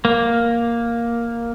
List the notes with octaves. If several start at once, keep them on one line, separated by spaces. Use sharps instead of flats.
A#3